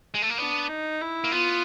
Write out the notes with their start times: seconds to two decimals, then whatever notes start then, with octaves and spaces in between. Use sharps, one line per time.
0.14 G#3
0.22 A3
0.30 A#3
0.38 B3 D4
0.69 D#4
1.01 E4
1.24 A#3
1.32 B3 F4